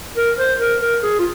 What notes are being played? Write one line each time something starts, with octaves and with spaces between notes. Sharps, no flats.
A#4
C5
A#4
A#4
G#4
F4